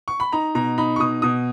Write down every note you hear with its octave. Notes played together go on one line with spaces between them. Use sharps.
C#6
B5
D#4 A#5
B2 A#5
D#4 B5
C#6
B2 D#6
B2 D#6